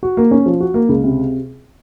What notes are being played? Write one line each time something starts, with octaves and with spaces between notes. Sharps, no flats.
F#4
A#3
C#4
F3
F#4
A#3
C#2
C3